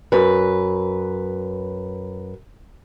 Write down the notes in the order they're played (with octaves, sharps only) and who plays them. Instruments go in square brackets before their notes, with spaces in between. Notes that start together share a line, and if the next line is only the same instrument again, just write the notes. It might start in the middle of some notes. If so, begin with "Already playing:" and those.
[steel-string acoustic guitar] F#2 B4